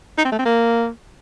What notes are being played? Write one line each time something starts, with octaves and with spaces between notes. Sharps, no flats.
D#4
C4
A3
C4
A#3